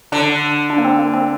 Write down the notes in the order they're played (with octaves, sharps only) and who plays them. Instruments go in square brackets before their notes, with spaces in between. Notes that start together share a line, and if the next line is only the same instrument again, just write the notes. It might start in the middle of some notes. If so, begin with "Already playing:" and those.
[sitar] D3 [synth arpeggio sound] D4
[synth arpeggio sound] D4
A#3
C4
A#3
C4